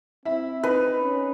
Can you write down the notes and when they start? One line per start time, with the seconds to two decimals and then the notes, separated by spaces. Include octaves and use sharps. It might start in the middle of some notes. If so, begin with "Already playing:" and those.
0.25 C4 E4 E5
0.63 D#4 B4
1.01 C#4